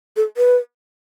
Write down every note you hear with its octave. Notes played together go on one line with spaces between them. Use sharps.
A4
B4